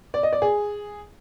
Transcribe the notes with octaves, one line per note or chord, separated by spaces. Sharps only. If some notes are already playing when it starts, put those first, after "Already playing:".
D5
D#5
D5
G#4